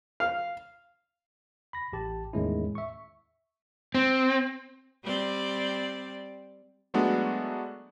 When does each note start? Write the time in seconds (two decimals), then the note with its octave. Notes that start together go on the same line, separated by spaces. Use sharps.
0.20 F5
1.73 B5 A#6
1.93 A1 G4 A5
2.33 E2 A2 D#3 G#3 C#4 E4
2.75 E5 C#6
3.95 C4
5.04 G3 C4 D5
6.94 F#3 G#3 A3 B3 D4 F#4